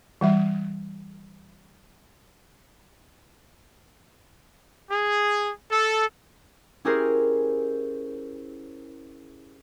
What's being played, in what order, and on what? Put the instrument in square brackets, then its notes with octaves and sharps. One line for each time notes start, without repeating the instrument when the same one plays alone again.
[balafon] E3 G3 E5
[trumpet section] G#4
A4
[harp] C#4 E4 G4 G#4 A#4 C5